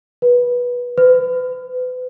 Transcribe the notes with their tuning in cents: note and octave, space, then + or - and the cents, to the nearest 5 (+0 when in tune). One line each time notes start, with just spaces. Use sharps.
B4 -15
B4 +35